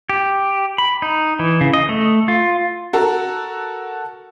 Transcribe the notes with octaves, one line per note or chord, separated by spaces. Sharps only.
G4
B5
D#4
E3
C#3
D#5
A3
F4
F#4 A4 A#4